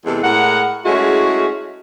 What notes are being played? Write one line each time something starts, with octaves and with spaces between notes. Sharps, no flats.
E2 C3 G#3 A4
A2 G#3 A#4 F#5
G#3 A3 C#4 E4 F#4 G#4